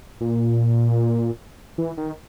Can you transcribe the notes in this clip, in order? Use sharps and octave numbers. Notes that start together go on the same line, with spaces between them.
A#2
E3
D#3